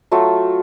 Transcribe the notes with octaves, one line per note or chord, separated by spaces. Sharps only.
F#3 A3 F4